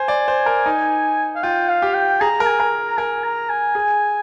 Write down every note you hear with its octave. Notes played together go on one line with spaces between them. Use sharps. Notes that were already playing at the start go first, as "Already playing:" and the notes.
Already playing: C5 G#5
D5
C5
A#4
D#4
F5
F4 G5
F5
G4
G5
G#4 A#5
A#4
G#5
A#4
A#5
A#4 G#5
A#5
G#5
G#4